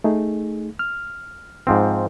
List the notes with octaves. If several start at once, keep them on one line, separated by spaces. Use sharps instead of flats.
A3 D#4 G#4
F6
G#2 F3 C4